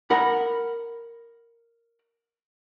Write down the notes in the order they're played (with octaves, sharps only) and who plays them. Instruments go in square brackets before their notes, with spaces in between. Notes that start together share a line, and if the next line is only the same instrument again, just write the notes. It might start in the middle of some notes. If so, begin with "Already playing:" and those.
[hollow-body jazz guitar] A#4 F#5 B5